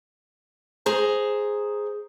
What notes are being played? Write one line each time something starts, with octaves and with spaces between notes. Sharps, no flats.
G#4 C5 A#5